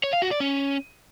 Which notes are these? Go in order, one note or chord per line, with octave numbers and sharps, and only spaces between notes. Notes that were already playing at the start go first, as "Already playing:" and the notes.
C#5
F5
F#4
D5
C#4